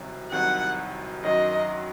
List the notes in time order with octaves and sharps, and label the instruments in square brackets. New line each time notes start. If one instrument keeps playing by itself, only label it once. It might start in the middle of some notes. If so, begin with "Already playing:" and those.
Already playing: [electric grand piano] C2 C3 D#3 F#3
[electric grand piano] C2 C3 D#3 F#3 [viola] F#5
[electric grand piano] F#2 D#3 F#3 [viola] D#5